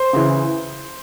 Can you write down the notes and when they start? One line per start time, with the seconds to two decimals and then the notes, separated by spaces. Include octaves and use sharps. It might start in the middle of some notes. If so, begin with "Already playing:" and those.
Already playing: C5
0.13 C#3 E3